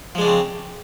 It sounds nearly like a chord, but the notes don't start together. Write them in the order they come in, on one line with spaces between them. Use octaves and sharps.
F3 G#3 D4 C#3 C4